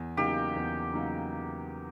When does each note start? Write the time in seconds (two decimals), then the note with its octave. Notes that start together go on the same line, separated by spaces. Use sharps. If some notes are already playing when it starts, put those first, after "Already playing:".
Already playing: E2
0.17 C#3 F#3 A#3 D#4 G4
0.56 E2
0.93 C#3 F#3 A#3 D#4